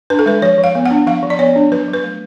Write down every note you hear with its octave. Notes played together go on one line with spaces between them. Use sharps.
D4 B4
A4
G#3 B4
F3 C#5
F3
F5
B3
F#5
D4
F3 F5
F3
D5
B3 C#5
D4
F#3 B4
F#3
B4
A3